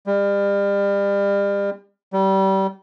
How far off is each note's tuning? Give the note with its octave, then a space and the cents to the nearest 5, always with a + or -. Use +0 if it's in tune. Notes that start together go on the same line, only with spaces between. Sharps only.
G3 +35
G3 -25